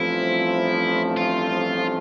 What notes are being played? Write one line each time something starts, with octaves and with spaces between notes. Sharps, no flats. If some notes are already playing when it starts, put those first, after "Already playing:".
Already playing: A1 G2 F3 A3 C4 E4
F4